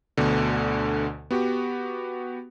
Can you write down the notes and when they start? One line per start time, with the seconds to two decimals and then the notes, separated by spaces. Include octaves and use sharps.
0.17 D2 B2 D3
1.31 B3 F#4 G4